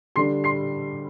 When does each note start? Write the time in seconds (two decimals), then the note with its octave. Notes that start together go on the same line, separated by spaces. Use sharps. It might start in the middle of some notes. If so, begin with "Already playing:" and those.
0.16 D3 G3 D4 C6 C7
0.44 C6 C7